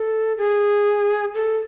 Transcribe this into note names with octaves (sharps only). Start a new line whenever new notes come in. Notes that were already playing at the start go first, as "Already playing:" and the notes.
Already playing: A4
G#4
A4